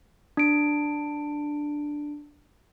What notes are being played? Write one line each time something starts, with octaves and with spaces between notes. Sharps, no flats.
D4 D7